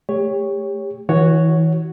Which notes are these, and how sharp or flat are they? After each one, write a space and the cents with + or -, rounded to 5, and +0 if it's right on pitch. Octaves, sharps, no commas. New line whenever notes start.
A3 +0 G4 +30 C#5 +0
E3 -30 F#4 +0 C#5 +0